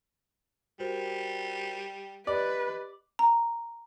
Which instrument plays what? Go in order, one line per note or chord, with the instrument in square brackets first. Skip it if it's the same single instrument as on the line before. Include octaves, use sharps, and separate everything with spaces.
[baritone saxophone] G3 [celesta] F#4 A#4 C5
[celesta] G4 D#5 A6 [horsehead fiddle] B4 [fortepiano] D5
[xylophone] A#5